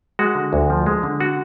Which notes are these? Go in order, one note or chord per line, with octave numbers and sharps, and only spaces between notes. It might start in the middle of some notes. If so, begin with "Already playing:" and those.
G#3 F#4
D3
D2
F3
G#3
D3
F#4